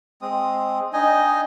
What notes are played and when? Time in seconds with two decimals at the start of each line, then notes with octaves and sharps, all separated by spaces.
0.22 G#3 C4 D#6
0.93 D4 D#4 D#5 G5 G#5